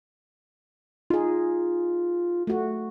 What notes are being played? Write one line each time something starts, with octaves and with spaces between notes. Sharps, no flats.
D#4 F4 G#4
A3 F#4